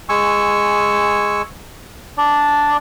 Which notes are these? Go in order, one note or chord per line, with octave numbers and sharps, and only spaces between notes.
G#3 G#5 C#6 E6
D4 D5